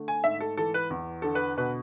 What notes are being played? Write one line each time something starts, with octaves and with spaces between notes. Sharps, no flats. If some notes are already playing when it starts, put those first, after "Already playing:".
Already playing: D3 A3
G#5
G#2 E5
A4
E3 A4
B4
E2
D3 A4
B4
B2 B4